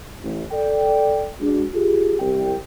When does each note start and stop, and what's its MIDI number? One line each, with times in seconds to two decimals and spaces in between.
0.22 0.42 33
0.51 1.28 69
0.51 1.28 74
0.51 1.28 79
1.39 1.63 56
1.39 1.63 62
1.39 1.63 66
1.74 2.14 65
1.74 2.14 67
1.74 2.14 68
2.20 2.52 36
2.20 2.52 67
2.20 2.52 79